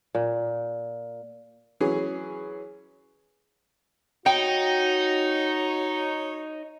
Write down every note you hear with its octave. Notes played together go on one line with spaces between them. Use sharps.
A#2
E3 F#3 C#4 G#4
D#4 F#4 C#5 G5